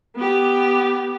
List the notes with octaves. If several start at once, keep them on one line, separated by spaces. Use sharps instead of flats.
B3 G4